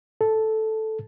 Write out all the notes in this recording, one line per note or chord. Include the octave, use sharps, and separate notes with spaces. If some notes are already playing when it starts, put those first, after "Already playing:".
A4